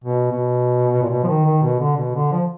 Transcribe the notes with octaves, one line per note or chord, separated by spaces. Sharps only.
B2
B2
A#2
B2
F3
D#3
D#3
B2
D3
B2
D3
F3